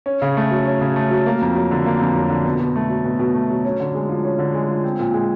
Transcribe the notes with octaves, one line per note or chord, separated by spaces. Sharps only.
C#4
C#3
A3
F#3
C#4
C#3
A3
F#3
A#3
F2
F#3
D3
A#3
F2
F#3
D3
B2
B2
A3
F#3
B2
B2
A3
F#3
C#4
D3
G#3
F3
C#4
D3
G#3
F3
C4
A#2
G#3